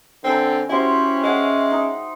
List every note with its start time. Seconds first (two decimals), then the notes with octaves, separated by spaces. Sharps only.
0.24 D3 C4 G5 G#5 A#5
0.69 C#4 E4 F#4 G4 C5
1.23 G#3 E5 F#5 G5
1.71 D#4